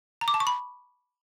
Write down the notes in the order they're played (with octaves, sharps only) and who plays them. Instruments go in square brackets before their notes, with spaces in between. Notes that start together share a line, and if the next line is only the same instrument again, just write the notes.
[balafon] A#5
D6
A5
C#6
B5